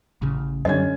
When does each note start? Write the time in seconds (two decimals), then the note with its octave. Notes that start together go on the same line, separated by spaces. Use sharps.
0.22 A1 C#3
0.65 F#2 D3 G3 C#4 D#5 G#6